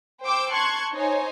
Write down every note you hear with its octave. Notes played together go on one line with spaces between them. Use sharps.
C5 G5 D6 E6
A5 C6 C#6 F#6 G#6
D#4 C5 C#5 G#5